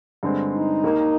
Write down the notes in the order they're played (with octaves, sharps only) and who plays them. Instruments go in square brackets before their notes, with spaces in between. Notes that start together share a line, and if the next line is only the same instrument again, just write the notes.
[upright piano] G2 D3 G#3 C4
[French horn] D#4
[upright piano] D#2 D#3 A#3